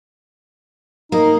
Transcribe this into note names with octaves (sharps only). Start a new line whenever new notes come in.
A#3 D#4